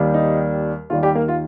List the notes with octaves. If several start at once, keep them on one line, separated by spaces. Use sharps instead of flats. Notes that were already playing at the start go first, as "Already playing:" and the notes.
Already playing: D#2 D#3 G3
D#4
D#2 D#3 G3 F4
G3 G4
A#3 A#4
F4